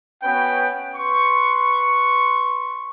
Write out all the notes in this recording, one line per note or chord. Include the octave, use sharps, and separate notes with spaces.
B3 C#4 F#4 B4 G5
B4 C6 C#6